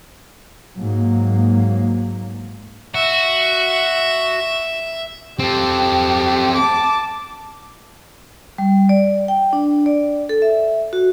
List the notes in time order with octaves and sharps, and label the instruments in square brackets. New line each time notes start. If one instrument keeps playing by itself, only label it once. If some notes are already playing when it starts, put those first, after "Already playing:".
[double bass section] G#2 F#3 A#3
[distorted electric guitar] F#4 [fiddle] E5
[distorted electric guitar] C4 A4 [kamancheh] G4
[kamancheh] A5 D6
[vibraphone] G3
D5
G5
D4
D5
A4
E5
F#4